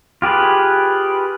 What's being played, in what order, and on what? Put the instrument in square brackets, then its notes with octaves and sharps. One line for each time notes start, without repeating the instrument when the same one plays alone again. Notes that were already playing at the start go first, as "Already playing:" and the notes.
[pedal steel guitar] F4 G4 G#4 B4